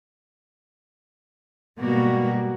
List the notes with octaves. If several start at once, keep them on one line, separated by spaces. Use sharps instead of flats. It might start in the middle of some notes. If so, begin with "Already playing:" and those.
G#2 B2 G3 A#3 F#4